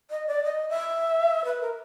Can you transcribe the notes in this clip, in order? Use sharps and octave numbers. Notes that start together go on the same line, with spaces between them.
D#5
D5
D#5
E5
B4
A#4